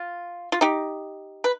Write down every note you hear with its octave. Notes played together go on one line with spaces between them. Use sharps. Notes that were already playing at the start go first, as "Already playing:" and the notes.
Already playing: F4
F4
D#4 G4
B4